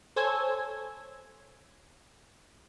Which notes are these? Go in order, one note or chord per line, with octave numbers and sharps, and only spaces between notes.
A4 C5 C#5 G#5 E6 G#6